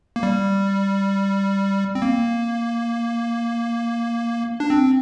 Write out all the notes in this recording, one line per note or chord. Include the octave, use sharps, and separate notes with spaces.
A#3
G3
C4
A#3
D4
C4